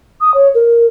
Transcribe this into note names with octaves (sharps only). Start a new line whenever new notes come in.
D#6
C#5
A#4